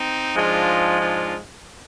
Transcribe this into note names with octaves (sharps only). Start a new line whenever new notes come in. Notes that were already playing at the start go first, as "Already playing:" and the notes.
Already playing: C4 D#4
G#2 F3 G#3 D4 F4
D4 F4